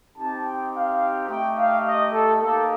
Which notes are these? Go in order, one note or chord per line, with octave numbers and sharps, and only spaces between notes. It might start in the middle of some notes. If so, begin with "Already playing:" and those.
C4 D#4 G4 A5
G5
F5
A3 D#4 G4 G5
F5
D#5
A4
A#3 D#4 G4 A4